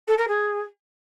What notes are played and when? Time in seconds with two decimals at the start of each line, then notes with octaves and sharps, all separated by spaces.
0.07 A4
0.17 A#4
0.28 G#4